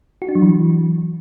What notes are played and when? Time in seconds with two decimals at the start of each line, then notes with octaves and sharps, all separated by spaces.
0.22 F#4
0.29 D4
0.35 F#3
0.42 E3